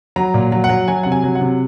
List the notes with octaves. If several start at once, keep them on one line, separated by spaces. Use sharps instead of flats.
F#3 A#5
A#2
F#3
F#5
F#3
F#3 G#5
C3 F#5
G#5
F#3
F#5
C3